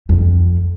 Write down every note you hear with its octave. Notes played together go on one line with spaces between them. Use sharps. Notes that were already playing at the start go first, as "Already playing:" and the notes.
F2